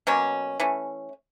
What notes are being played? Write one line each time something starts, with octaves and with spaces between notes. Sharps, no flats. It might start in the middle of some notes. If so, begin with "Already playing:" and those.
B2 F#3 A#3 C#4
E3 A3 C#4